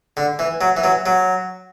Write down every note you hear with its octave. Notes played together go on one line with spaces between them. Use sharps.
D3
E3
F#3
E3
F#3
F#3